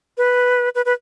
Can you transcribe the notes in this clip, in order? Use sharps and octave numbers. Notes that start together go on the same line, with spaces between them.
B4
B4
B4